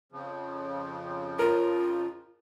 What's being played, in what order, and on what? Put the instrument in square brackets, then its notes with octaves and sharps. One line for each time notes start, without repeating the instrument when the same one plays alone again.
[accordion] F2 C#3 F3
[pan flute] F4 [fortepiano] A#4